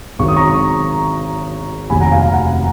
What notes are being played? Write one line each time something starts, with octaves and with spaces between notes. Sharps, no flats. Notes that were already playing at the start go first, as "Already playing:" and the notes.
G#1 G#2 D#3 F#3 C#6
D#6
A#5 C#6
F1 D#2 D#3 F#3 G#5 B5
F#5 A#5
F5 G#5
F5 G#5
F#5 A#5